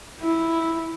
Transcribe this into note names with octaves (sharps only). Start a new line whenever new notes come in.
E4